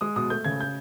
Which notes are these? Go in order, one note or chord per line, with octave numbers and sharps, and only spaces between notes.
G#3 D#6
B2 D#6
A3 G6
C#3 G#6
G6